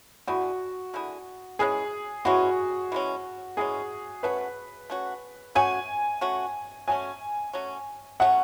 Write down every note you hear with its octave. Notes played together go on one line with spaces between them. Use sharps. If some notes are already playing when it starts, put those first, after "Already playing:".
D3 A3 E4 F#4 G#4
D3 A3 E4 G#4
E3 G#3 C#4 G#4
E3 G#3 C#4 F#4
E3 G#3 C#4
E3 G#3 C#4 G#4
A3 C#4 F#4 B4
A3 C#4 F#4
A3 C#4 F#4 G#5
A3 C#4 F#4
F#3 A3 C#4 G#5
F#3 A3 C#4
F#3 A3 C#4 F#5